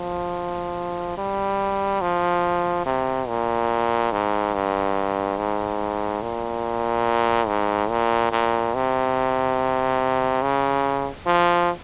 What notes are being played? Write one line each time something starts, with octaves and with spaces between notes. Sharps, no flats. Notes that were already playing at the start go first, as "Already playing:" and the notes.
Already playing: F3
G3
F3
C3
A#2
G#2
G2
G#2
A#2
G#2
A#2
A#2
C3
C#3
F3